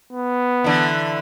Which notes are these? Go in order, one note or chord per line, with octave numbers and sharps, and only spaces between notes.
B3
D3 E3